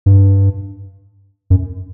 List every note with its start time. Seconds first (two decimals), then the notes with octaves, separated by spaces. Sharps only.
0.06 G2
1.50 F#2